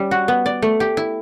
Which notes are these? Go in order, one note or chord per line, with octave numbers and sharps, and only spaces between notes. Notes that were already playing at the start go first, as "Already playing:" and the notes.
Already playing: G3 C#4
F#4
B3
D5
A3
G4
E4